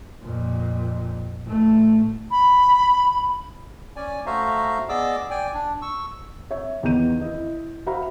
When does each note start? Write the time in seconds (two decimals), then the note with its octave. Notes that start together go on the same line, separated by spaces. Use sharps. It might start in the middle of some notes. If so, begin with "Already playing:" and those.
0.23 F2 A#2
1.44 A1 A3
2.31 B5
3.96 C#4 D5 G#5
4.26 A3 F#4 C5 E5 F5 A#5
4.89 B3 G#4 D5 D#5 D6 E6
5.31 D5 G5 G#5
5.54 D4
5.82 C#6 E6
6.51 C#5 E5
6.83 E2 D#3 B3 A#5 G6 D#7
7.21 E4 D#5
7.86 F#4 C5 E5 F5 A#5 B5